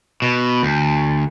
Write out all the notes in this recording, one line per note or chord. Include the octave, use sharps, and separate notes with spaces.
B2
D2